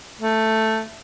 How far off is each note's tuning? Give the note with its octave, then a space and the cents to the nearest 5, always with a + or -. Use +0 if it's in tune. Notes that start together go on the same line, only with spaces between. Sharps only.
A3 +5